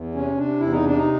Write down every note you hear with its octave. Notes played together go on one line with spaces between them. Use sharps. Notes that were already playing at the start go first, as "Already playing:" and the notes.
Already playing: E2
C3 C#4
C3 D4
E2 E4
D#4
C3 D4
D#4